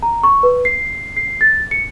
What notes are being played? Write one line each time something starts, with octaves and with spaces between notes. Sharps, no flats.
A#5
C#6
B4
C7
C7
A6
C#7